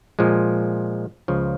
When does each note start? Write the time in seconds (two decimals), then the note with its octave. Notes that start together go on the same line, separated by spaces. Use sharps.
0.19 A#2 F3 G#3
1.28 C#2 C#3 F3